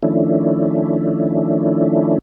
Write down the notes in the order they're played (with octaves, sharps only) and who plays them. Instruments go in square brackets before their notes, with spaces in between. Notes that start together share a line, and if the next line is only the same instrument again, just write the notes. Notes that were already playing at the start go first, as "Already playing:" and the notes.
[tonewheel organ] D#3 F3 A3 C#4 D4 E4